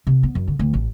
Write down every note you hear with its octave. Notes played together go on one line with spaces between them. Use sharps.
C3
B3
F#2
D3
D2
A1